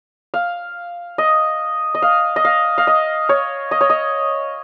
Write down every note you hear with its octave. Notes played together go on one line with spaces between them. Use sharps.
F5
D#5
D#5
F5
D#5
F5
F5
D#5
C#5
D#5
C#5
D#5